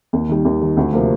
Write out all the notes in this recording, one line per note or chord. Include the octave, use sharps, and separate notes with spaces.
D#2
D#3 G3
D#2
D#3 G3
D2
C3 F3 A#3